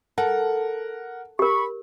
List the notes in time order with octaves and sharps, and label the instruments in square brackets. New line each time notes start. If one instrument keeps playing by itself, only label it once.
[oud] A4 [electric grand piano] A#4 F#5
[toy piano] G4 A#4 [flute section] B5 C#6